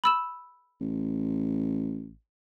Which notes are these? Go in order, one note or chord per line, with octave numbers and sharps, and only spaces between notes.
B5 E6 E7
A1